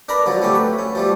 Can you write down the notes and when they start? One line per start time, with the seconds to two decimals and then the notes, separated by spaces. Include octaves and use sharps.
0.09 D4 A#4 B4 A#5 B5
0.26 D3 F3 F#3
0.42 A3 C4 C#4 G4
0.55 B4
0.79 C#4
0.95 F3 G3 A3